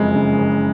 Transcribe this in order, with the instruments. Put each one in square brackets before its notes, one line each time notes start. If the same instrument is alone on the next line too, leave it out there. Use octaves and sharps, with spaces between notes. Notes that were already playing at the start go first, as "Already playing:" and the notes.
Already playing: [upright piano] F#1 F2 [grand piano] G#3
[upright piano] C#3
F#1